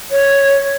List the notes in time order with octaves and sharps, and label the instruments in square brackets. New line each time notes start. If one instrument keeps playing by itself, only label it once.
[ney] C#5